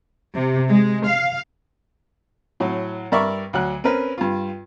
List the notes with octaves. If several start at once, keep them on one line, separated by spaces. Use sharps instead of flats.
C3
G#3
F5
A2 F#3
G2 A#4 D5 E5 C#6
D2 F#3 F#6
C4 C#4 A#4 B4
G2 F4